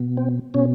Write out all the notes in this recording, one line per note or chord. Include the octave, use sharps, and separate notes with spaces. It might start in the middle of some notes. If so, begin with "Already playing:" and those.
Already playing: B2
C4
B2 C#4